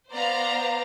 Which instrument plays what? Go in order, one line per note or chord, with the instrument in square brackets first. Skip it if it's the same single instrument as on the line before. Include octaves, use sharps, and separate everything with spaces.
[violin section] B3 C5 D5 F5 A#5